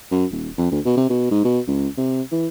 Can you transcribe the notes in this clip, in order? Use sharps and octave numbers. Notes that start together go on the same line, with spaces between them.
F#2
D#1
F2
D2
B2
C3
B2
G#2
B2
C#2
C3
E3